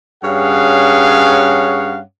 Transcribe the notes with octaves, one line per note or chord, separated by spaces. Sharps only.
G2 C#4 G#4 C#5 F5 F#5